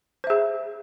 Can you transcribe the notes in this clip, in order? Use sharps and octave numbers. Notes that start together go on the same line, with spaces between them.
G#4 C5 E5